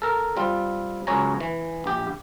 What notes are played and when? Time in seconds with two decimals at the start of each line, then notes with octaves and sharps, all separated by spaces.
0.02 A4 A#4
0.37 G3 C4 F4
1.07 C#2 F#2 C#5 G#5 A#5
1.40 E3
1.84 A#1 G4